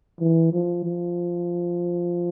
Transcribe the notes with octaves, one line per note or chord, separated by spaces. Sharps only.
E3
F3
F3